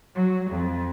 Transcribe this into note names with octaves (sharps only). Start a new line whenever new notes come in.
F#3
F2